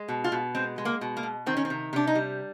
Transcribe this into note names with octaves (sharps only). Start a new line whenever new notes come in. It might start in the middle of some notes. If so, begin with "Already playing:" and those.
Already playing: G#3
B2
F4
B2
G#3 C4
G#3
A#3
B2
A#3
B2
D#3 C4
C#4
C4
C3
C3 D4
D#4
G3